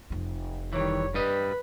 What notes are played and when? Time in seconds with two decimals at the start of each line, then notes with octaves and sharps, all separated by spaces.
0.10 F1 F4
0.73 D#3 E3 G3 C#5
1.14 G2 G3 B4 D#5